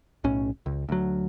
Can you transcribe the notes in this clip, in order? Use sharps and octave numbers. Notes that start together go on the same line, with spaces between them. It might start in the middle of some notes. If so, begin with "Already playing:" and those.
B1 A2 C#4
C#2
D2 F#3